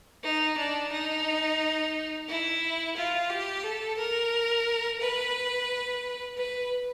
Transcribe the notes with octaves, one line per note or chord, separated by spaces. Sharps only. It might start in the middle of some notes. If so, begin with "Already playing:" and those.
D#4
D4
D#4
E4
F4
G4
A4
A#4
B4
B4